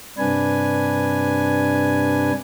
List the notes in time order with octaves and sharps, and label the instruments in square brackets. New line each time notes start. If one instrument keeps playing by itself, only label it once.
[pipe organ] G2 C3 D4 B4 G#5